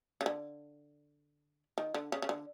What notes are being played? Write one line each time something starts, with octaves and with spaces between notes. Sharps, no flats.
C#3
D3
D#3
D3
C#3
C#3
D3